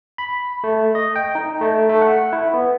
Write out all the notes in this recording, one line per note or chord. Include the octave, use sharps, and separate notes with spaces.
B5
A3
D#5
G5
D#4
A3
A3
F#5
E4
B3